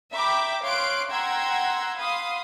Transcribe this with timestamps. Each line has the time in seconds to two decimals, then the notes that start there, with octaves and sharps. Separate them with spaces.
0.14 E5 G5 A#5 B5 D6
0.63 C#5 F5 C6 F#6 D7
1.10 F#5 G5 A#5 C6 E6 G#6
1.99 F5 B5 C6 D#6